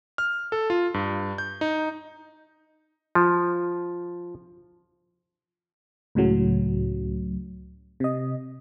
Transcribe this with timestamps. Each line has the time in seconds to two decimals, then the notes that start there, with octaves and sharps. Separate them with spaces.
0.18 F6
0.52 A4
0.70 F4
0.94 G2
1.38 G6
1.61 D#4
3.15 F3
6.15 C#2 A2 C#3 F#3
8.00 C3 D#5